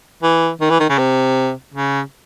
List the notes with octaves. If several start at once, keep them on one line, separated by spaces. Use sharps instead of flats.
E3
D#3
E3
D#3
C#3
C3
C#3